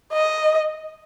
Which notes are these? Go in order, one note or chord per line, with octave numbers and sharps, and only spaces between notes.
D#5